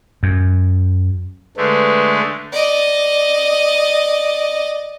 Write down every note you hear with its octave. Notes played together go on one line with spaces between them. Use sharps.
F#2
D3 G#3 A3 B4
D5 D#5